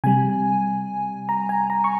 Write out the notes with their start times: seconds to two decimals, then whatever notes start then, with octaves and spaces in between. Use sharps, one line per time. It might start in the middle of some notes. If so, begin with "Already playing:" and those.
0.04 C3 G3 G#5
1.29 A#5
1.49 G#5
1.70 A#5
1.84 C#6